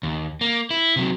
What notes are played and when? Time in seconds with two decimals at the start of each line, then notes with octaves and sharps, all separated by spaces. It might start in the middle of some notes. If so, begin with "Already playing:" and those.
0.03 D#2
0.41 A#3
0.71 E4
0.96 C3 F#3